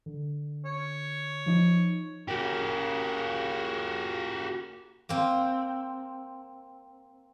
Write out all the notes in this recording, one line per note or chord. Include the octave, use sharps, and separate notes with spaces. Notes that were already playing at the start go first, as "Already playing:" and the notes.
D3
C#5
F3 D#4
C#3 A#3 F#4 G4
A#3 C4